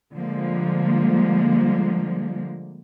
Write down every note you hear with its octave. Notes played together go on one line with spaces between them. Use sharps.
D3 F3 G3 G#3 A#3